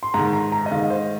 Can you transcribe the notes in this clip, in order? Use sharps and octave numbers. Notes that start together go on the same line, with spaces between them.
C6
G#2 D#3 A#5
A#5
A#5
D#5
G#2 D#3 F5
C5